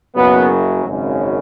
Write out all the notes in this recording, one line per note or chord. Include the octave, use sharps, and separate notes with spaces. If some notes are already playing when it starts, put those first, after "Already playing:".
F#1 F#2 C#3 F#3 B3
G#1 F#2 C#3